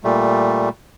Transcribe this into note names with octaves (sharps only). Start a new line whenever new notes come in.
A#2 G3 A3